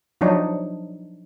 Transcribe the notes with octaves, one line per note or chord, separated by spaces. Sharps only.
F3 F#3 D4 D#4 C#5